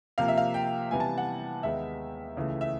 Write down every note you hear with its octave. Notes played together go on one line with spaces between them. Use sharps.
C3 F3 A#3 F5
E5
F5
G5
C3 E3 G3 B3 E4 G#5
A5
F#5
D#2 D#3 G#3 B3 D#4 E5
C#2 C#3 E3 A3
E5